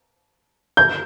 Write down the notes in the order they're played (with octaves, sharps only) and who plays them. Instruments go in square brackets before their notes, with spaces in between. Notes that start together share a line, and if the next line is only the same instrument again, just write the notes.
[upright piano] G6